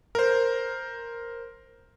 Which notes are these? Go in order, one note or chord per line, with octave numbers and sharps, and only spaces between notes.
A#4 C5